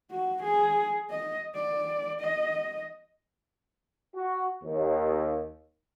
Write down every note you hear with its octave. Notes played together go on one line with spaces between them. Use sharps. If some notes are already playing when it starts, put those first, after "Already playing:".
F#4
G#4
D#5
D5
D#5
F#4
D#2